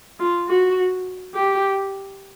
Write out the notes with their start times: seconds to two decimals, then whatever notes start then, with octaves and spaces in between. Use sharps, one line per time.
0.20 F4
0.49 F#4
1.35 G4